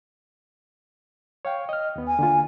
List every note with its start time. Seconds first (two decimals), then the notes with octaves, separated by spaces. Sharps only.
1.45 C#5 F5 G5
1.69 D#5 F6
1.96 D#2 B3
2.07 G#5
2.19 D3 A#3 F4